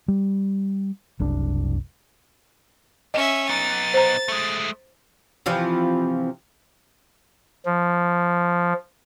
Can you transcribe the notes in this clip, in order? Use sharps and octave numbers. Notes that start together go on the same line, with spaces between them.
G3
F#1 C2 D4
C#4 D#5 E5
B3 D#4 A6
C5 A#5
G#3 A3
C3 E3 F3
F3